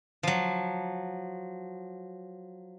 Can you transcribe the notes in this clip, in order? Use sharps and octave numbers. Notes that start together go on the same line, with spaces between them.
F3 F#3